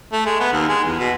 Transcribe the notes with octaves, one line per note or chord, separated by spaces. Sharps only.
A3
G#3
B3
D#2
G#3
E2
B2